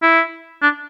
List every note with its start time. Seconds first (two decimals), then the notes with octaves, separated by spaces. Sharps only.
0.02 E4
0.62 D4